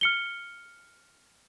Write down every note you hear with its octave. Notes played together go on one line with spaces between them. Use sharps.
F6 C#7 G7